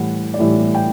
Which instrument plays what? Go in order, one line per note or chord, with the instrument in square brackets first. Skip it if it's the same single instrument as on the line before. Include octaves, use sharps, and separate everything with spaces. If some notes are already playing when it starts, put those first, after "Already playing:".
Already playing: [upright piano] A2 E3 G3 F#5
D5
A2 E3 G3 E5
G5